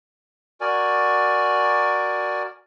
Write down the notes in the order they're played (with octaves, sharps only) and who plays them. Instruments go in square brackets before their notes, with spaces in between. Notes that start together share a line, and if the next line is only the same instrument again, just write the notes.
[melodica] F#4 A#4 D5 G#5